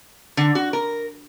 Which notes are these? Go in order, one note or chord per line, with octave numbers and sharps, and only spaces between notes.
D3
F#4
A#4